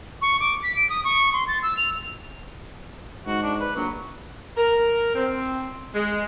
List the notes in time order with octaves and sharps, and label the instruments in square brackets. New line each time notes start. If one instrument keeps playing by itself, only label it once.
[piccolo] C#6
D6
B6
D7
D#6
C#6
C6
A6
E6
F7
[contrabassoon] G#2 [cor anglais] F#4
[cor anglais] D4
B4
[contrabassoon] A#1 [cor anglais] F#3
[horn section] A#4
C4
G#3